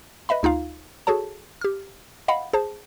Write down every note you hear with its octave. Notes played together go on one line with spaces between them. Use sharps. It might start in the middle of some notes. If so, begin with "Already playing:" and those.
B4 D#5 E5 B5
D2 D#4 F4 F5
F#4 G#4 A4 C#5 A5
G4 F6
D#5 F5 F#5 B5
G#4 C5 A5